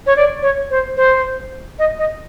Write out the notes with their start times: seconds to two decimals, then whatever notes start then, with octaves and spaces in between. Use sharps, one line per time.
0.06 C#5
0.16 D5
0.42 C#5
0.71 C5
0.97 C5
1.79 D#5
1.99 D#5